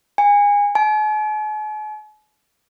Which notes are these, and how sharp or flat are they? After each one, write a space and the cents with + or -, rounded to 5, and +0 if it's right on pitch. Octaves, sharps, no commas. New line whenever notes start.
G#5 -25
G#5 +45